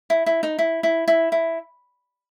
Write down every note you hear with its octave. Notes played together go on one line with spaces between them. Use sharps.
E4
E4
D#4
E4
E4
E4
E4